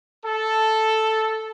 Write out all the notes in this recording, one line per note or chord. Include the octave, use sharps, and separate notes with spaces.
A4